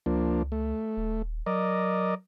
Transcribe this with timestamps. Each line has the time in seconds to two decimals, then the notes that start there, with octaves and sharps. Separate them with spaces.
0.06 C#2 F3 A#3 D4
0.52 A3
0.97 D#1
1.46 F#3 A#4 D5 D#5